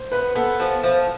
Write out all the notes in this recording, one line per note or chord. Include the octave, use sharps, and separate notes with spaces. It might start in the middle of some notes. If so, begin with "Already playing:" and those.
Already playing: C5
B3 B4
B3 A4
F3
F3